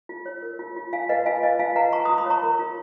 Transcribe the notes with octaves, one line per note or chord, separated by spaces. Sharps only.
F4
C#5
A#4
F4
F4
F4 F5 G#5
B4 D#5 F#5
F4 F5 G#5
B4 D#5
F4 F5 G#5
B4 F#5 A#5
F4 A#5 C#6
B5 D#6
F4
B5 D#6
C#5 A#5 C#6
A#4
F4